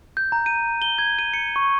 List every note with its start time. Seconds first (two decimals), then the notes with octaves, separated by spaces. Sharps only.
0.17 G6
0.32 A#5
0.46 D#7
0.82 G7
0.98 G#6
1.19 D#7
1.33 C#7
1.56 C#6